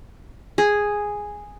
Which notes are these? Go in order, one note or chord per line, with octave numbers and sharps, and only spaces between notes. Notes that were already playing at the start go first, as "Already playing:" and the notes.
G#4